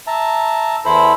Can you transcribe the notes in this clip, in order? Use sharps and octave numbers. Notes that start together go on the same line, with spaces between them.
E5 A5 A#5
E2 E4 A4 C5 B5